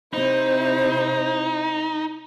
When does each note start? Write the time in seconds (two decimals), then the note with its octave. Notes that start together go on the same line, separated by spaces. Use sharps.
0.14 C3 C4 D#4 E4 C5